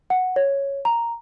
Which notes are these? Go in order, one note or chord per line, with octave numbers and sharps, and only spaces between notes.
F#5
C#5
A#5